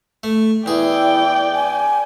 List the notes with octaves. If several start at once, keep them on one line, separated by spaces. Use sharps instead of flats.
A3
E2 E4 G#4 D5 G5
G#5